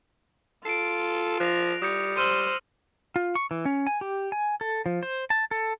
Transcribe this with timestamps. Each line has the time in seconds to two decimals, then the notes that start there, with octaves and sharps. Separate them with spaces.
0.65 F4 A4 C7 D7
1.40 F3 F#6 A#6 F7
1.82 G3 D#6 G6 C#7
2.17 C5 E6 F6 D#7
3.16 F4
3.35 C#6
3.51 E3
3.65 C#4
3.87 G#5
4.01 G4
4.32 G#5
4.61 A4
4.86 F3
5.03 C5
5.30 A5
5.51 A4